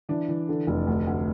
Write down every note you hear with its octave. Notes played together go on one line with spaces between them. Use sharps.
E3 D4
E3
D3
F1
D2
D2